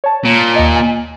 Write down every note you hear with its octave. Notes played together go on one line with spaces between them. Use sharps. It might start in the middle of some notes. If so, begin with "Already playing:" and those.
C#5 A5
A#2
D#2 D#5
G#5